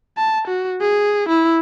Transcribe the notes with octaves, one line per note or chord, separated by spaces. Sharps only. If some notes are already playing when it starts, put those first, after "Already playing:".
A5
F#4
G#4
E4